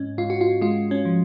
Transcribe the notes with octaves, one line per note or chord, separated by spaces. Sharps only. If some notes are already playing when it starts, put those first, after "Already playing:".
Already playing: G#2 C#4
G#2 F4
F#4
F4
G#3 F4
C#4
F3